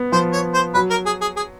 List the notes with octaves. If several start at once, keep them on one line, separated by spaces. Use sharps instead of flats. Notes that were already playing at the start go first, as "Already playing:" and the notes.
Already playing: B3
F3 C5
C#5
C5
F#3 B4
A#4
G#4
G#4
G#4